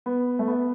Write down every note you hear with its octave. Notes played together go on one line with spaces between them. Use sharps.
B3
A3
B3